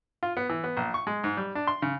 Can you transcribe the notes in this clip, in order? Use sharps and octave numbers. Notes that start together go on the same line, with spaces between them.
F4
B3
E3
B3
A#1
C#6
G#3
G#2
G3
D4
C6
C#3